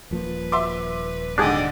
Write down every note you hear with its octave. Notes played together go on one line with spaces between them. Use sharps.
D#1 F3 A#3 B4
E5 C6 D6
G#2 D3 D4 G4 G#4 D5 D#5